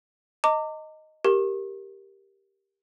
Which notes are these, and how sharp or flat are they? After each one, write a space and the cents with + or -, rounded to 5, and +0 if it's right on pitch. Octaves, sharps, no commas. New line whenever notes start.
D#5 +0 A#5 -40 D6 +0
G4 +0 A#4 +0 C#6 -45